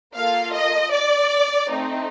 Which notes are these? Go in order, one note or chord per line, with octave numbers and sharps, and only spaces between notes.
A#3 F4 A4 F5
D#5
D5
A3 C4 D#4